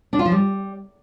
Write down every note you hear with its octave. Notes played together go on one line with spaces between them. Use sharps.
D4
F4
F3
G3